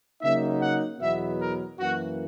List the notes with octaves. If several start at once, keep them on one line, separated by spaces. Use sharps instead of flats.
C#3 F#3 A#3 D#4 E5
F#5
E2 B2 F#3 B3 E5
A#4
F#2 E3 A#3 F#4